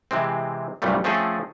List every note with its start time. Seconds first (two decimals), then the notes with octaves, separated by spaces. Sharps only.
0.11 C3 E3 G#3 C4
0.82 C2 G2 A#2 F#3 G3 A3
1.04 F3 A3 C4 C#4 G#4 A4